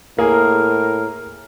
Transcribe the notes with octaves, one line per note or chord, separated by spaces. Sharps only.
A2 A#3 G#4 A#4